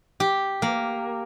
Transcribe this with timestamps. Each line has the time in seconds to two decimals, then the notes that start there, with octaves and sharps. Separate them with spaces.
0.20 G4
0.62 A#3